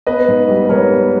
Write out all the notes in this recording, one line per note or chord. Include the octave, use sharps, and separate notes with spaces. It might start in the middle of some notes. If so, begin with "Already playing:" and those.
B3 B4 D#5
G#2
G3
B4
G#2 A#4 C#5
B3